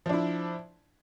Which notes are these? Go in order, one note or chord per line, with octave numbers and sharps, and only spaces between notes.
F3 D4 E4